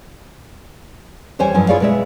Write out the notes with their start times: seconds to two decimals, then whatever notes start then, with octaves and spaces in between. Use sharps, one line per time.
1.39 E2 G3 C5 C#5 G#5
1.54 G2 F3 F#3 G#5
1.69 E4 F4 G#4 C#5 D5 F5
1.80 B2 G#3 E5